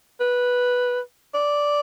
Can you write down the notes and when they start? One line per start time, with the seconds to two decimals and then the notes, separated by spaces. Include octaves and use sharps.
0.21 B4
1.34 D5